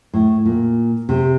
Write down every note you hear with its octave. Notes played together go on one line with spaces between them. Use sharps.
A2
A#2
C3